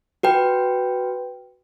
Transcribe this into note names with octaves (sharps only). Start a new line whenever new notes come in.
F#4 B4 G5